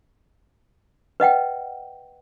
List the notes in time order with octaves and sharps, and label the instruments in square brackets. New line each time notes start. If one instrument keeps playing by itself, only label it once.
[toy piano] B4 D#5 F#5 G5